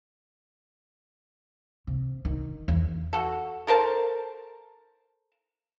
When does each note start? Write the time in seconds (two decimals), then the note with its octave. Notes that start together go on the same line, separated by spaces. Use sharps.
1.87 C3
2.25 D#3
2.68 E2
3.13 F#4 A4
3.67 A4 A#4 C5 A5